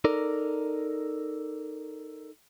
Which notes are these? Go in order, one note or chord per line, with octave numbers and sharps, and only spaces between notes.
D#4 A4 A#4 D5